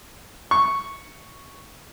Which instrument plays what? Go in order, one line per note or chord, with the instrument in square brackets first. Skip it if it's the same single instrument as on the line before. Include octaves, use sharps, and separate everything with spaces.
[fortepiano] C#6